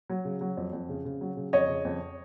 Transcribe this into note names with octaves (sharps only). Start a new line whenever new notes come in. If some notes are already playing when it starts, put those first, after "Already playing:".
F#3
C#3
F#3
F2
F2
C#3
C#3
F#3
C#3
F2 C#5 D#5
C#3
F2